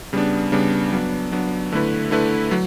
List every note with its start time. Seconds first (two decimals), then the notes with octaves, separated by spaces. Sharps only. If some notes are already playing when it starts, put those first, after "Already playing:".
0.13 C#3 G3 B3 D4
0.52 C#3 G3 B3 D4
0.92 F#3 B3 D4
1.32 F#3 B3 D4
1.72 D3 A3 E4 B4
2.11 D3 A3 E4 B4
2.51 F#3